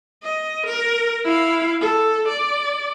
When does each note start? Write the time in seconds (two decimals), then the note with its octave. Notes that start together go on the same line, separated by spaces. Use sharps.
0.23 D#5
0.67 A#4
1.24 E4 F5
1.81 A4
2.28 D5